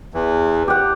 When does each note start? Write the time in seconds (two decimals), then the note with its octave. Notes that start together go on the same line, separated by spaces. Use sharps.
0.14 E2 E3
0.68 G4 F#5